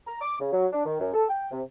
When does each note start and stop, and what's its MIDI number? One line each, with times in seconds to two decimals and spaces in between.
0.07 0.21 82
0.22 0.40 86
0.40 0.52 49
0.52 0.67 54
0.73 0.82 62
0.86 0.99 51
1.01 1.11 42
1.14 1.25 69
1.29 1.47 79
1.52 1.62 48